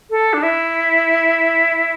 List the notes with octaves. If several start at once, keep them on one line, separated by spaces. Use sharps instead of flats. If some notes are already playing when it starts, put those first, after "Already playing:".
A4
D4
E4